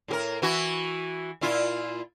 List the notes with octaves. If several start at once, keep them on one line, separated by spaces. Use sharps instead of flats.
A2 G4 A#4
E3 E4 F#4
A#2 E4 F4